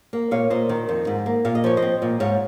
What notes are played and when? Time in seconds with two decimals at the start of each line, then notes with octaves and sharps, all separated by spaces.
0.13 A#3
0.31 A#2 C#5 F5
0.50 A#2 C5 D#5
0.69 D#3
0.89 F2
1.07 G#2
1.26 A#3
1.45 A#2 F5
1.55 D#5
1.64 F3 C#5
1.77 C5 D#5
1.82 C4
2.02 A#2
2.20 G#2 C#5 F5